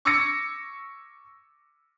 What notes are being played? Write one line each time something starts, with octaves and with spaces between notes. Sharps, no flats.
C#6 D6 E6 G#6 A#6 C#7